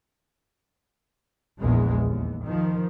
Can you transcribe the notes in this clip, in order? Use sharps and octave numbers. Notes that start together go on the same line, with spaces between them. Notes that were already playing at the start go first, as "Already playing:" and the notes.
A#1 E2 G#3
D#2
D#3 F3